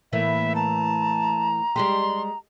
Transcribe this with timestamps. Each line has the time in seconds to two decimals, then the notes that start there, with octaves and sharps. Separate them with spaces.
0.13 A2 E3 A#3 E5
0.55 A5 A#5
1.76 G3 G#3 G4 C6